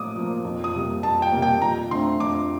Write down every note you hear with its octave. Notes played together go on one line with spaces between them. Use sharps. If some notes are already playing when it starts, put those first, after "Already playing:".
Already playing: A2 F3 A#3 D6 D#6
F3 A#3
F2
D#6
C3 G3 A#3
F2 A5
G5
C3 G3 A#3
G5
F2 A#5
D3 A3 C4 C6
F2 D6